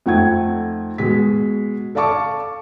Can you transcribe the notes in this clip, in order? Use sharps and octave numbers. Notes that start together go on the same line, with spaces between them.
F2 A3 D#4 F#5 G5 G#6
B2 G#3 B6
A4 D5 F5 A5 C#6 D6